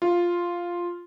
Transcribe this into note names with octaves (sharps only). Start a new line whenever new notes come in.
F4